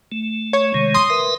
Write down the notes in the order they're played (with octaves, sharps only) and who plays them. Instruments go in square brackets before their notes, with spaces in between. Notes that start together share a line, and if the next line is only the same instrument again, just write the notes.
[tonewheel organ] A3
[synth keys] C#5
[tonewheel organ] C3 D#3 G#3
[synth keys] C6 D#6
[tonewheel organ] A#4 B4 E5